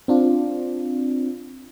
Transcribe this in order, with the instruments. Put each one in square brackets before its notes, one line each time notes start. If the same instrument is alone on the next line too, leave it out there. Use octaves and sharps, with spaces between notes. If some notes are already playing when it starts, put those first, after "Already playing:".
[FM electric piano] C4 D4 F4